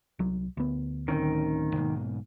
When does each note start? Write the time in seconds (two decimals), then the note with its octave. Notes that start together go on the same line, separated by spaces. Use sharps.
0.19 C2 F#3
0.57 D2 B3
1.08 D1 D#3 C4 C#4
1.75 B1 G#2 A#3